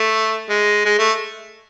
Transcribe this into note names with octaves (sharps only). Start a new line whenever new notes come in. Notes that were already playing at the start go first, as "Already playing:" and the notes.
Already playing: A3
G#3
G#3
A3